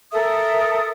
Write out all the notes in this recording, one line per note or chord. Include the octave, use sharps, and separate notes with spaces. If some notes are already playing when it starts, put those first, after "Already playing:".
A4 A#4 E5 D#6